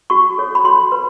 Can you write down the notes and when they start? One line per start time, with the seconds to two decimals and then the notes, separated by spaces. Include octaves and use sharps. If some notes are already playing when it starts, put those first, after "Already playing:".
0.10 F#4 C#6
0.38 A4 C#5
0.55 B5
0.65 F#4 C6
0.92 B4